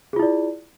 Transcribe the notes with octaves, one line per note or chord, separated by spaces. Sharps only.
E4 F4 G#4 D5